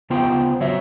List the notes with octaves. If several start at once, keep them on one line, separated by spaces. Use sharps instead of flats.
C#3 B3 F4 C5 G5
F#3 C#5 E5